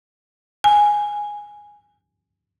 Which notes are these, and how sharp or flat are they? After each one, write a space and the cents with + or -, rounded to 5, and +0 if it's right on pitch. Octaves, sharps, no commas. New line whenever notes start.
G#5 -5